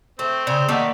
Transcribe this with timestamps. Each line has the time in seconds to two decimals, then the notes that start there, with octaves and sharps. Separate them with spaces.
0.19 A3 C4
0.47 C#3 D5 C6 D#6
0.69 D#3 A3 A#3 D5 F#5